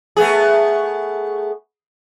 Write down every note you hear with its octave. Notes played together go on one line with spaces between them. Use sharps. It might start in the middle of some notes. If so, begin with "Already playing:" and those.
A3 B3 G#4